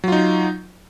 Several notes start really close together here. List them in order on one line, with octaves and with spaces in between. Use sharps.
F#3 F4 D#4